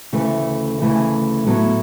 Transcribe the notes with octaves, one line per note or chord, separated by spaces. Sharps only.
D2 C#3 E3 A3
D2 C#3 E3 A3
A2 F#3 B3 E4 A4